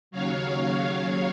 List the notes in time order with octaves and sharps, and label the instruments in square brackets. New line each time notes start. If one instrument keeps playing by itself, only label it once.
[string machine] D#2 C#3 F#3 C#5 F5